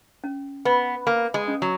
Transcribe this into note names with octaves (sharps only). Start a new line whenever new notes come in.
C#4
B3 B4
A#3 F5
G#3
C#4
F#3